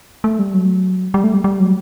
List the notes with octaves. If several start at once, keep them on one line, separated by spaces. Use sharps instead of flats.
A3
G3
F#3
G3
A3
G3
G3
F#3